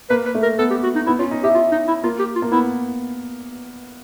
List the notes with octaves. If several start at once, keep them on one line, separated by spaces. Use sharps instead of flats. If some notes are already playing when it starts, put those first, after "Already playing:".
A#3 B4
B4
A3
A#4
B3 A4
G4
F#4
D#4
B3 E4
C#4 F4
D#4
E4 G4
F4
D#4
E4
A#3 F4
G4
F4
A#3
B3 E4